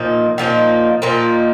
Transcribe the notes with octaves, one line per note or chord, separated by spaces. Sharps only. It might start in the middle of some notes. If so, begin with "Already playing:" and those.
Already playing: A#2 F3 A#3 D#4
A#2 F3 A#3 D#4
A#2 F3 A#3 D#4